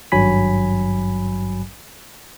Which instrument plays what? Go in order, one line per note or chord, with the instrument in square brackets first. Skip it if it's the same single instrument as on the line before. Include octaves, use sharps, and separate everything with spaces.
[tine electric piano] G#1 G2 F#3 G#5 B5 B6